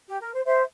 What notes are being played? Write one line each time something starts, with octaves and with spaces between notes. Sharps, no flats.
G4
A#4
C5
C5 E5